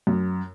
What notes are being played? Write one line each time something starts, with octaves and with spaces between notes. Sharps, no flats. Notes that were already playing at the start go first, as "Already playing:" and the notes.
F#2